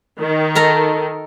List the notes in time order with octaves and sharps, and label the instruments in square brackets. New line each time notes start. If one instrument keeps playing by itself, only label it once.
[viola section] D#3
[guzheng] A4 A#4 A#5